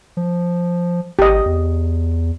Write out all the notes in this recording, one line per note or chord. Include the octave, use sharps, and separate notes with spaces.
F3
G#1 G4 D#5
E2